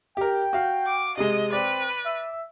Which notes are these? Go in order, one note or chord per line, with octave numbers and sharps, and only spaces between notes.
G4 A#4 G5
F#4 F5
D6
C3 G#3 D#5
C4 B4 D5
E5